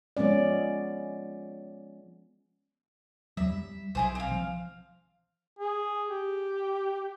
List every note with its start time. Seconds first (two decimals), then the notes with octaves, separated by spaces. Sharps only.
0.17 F3 G#3 B3 C#4 D5
3.37 E2 F#3 E5
3.49 G3
3.95 B1 E4 G#4 C5
4.15 C4 F5
4.32 F3
5.59 G#4
6.10 G4